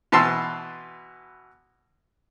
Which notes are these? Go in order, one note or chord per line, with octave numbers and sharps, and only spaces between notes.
B2 E3 A5 C6 E6